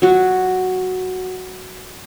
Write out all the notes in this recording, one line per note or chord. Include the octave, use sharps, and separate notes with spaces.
F#3 F#4